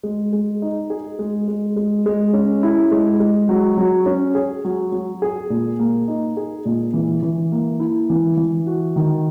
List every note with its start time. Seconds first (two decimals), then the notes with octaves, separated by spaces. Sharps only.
0.03 G#3
0.33 G#3
0.62 D#4
0.90 G#4
1.19 G#3
1.48 G#3
1.76 G#3
2.06 G#3
2.33 C#4
2.63 E4
2.92 G#3
3.20 G#3
3.49 F#3
3.77 F#3
4.06 C#4
4.35 G#4
4.65 F#3
4.92 F#3
5.22 G#4
5.50 A#2
5.79 A#3
6.08 D#4
6.37 G#4
6.65 A#2
6.94 E3
7.23 E3
7.52 A#3
7.80 E4
8.10 E3
8.37 E3
8.67 F#4
8.96 D#3